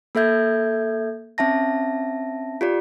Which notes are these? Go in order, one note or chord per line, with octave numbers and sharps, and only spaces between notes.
A#3 A4 E5 G6 G#6
C4 C#4 E5 A5 A#6
F4 G4 D5